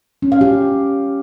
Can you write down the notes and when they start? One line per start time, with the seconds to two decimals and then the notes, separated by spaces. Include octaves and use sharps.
0.22 C#4
0.32 F5
0.41 G4